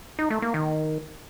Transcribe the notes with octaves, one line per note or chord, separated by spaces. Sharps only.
D#4
A3
A#3
D#3